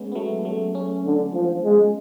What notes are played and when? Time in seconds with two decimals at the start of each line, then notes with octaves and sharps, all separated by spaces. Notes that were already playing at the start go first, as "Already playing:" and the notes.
Already playing: G#3 A3 B3 C#4
0.12 B3
0.15 F#3 A3
0.45 F#3 A3
0.75 A3 C#4
1.05 D3
1.34 F3
1.64 G#3